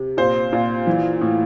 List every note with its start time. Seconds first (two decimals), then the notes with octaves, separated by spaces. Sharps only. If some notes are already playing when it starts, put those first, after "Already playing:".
Already playing: C3
0.17 A#2 C5
0.52 A#2
0.87 E3
1.21 A2